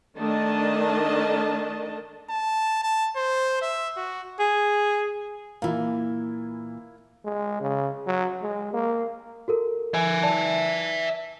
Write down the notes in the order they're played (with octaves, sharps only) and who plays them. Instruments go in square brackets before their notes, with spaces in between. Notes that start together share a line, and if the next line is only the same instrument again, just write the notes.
[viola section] D#3 A3 D4 D#5 A5
[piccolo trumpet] A5
A5
C5
E5
F#4
[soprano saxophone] G#4
[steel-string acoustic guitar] A#2 E3 [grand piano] A#3 E4
[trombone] G#3
C#3
F#3
G#3
A#3
[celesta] F#4 A4 A#4
[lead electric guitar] E5 G#5
[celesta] D5 A5